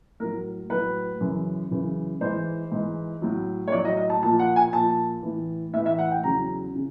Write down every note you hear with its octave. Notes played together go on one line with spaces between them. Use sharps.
A2 F#3 A#4
A2 F#3 B4
F#2 C#3 E3
F#2 C#3 E3
G#2 E3 C5
G#2 E3
A2 F#3
C#5
A2 F#3 D5
D#5
D#5
A5
A#2 F3 A5
F#5
G#5
A#2 F3 A5
A2 E3
A2 E3 E5
E5
F#5
G5
E2 C#3 F#3 A#5
C#3